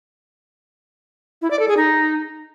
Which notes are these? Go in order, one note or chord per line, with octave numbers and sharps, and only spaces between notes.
E4
D5
A4
G#4
D#4